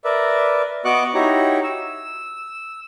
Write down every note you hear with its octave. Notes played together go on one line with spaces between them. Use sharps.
A#4 B4 D5 E5
B3 F#4 D#5 C#6 D6 F#6
D#4 E4 F#4 G4 C#5 A#5
E6